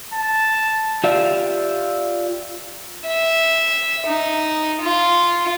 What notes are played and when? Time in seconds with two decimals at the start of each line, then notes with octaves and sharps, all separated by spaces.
0.14 A5
1.04 F4 G4 D5 E5 F5
3.08 E5
4.07 D#4
4.82 F4